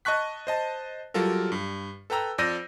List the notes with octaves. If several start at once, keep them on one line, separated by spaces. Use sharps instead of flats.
D#5 A5 C#6 F#6 B6
C5 D#5 A5
F#3 G3 F4 A4 A#4
G2
A4 B4 G5 A#5 E6
F2 D5 E6 G6 A#6 D#7